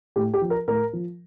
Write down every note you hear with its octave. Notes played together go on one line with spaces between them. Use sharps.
A2 G4
G4
F3
A#4
A2 A#4
F3